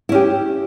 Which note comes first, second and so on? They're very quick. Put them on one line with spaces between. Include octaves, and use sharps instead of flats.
E4 C#4 G4